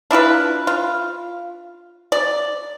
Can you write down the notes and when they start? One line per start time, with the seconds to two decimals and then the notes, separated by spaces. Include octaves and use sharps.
0.11 D4 E4 F4 B4
0.67 F4
2.12 D5